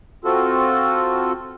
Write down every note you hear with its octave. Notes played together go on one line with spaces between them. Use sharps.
C4 F4 F#4 A4